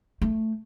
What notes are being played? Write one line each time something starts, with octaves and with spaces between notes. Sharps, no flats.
A3